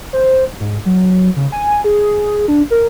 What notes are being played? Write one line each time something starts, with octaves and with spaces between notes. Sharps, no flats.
C5
G#2
F#3
C#3
G#5
G#4
D4
A#4